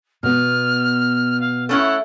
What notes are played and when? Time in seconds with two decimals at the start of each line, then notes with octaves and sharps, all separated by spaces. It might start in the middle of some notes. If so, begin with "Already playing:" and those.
0.23 B2 B3 F6
1.40 F5
1.69 A3 C#4 E4 F#5